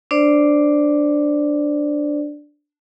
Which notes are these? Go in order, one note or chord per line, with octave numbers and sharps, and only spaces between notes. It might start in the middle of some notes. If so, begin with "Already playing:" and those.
D4 C5 D5